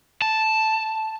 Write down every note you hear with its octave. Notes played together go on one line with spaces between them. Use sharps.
A5